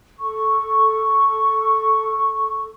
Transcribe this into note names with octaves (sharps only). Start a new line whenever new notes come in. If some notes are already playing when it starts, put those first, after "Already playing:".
A4 C#6